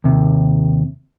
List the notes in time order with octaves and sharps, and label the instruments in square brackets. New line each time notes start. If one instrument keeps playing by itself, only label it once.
[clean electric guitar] D#2 C3